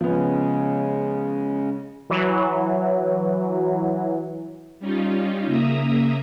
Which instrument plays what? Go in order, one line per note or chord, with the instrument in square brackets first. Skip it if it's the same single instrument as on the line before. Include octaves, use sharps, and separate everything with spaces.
[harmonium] C#3 G#3 C#4 [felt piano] F3 B3
[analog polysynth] E3 F#3
[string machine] G3 C#4 D#4 F4
C#3 A#3 E5 A#5 D#6